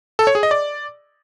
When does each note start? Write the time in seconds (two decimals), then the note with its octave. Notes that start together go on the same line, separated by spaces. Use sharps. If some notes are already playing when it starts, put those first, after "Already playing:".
0.19 A4
0.27 C#5
0.35 G#4
0.43 D#5
0.51 D5